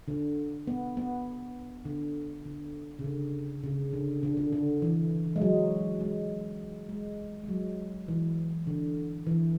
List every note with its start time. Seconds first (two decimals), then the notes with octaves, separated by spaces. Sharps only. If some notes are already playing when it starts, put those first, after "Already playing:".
0.08 D3
0.67 B3
0.97 B3
1.85 D3
2.45 D3
2.99 C#3
3.04 D3
3.64 C#3
3.93 D3
4.23 D3
4.37 D3
4.53 D3
4.82 E3
5.36 G#3
5.42 F#3
6.01 G#3
6.89 G#3
7.44 G#3
7.48 F#3
8.08 E3
8.67 D3
9.27 E3